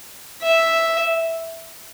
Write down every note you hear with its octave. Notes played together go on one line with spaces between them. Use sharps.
E5